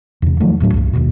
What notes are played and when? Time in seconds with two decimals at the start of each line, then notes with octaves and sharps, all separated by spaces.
0.22 E2 C3
0.40 D#3 F3 F#3 A3
0.60 D#1 A2 F#3 D4
0.74 C2 G2
0.93 D#1 A#1 D#2 B2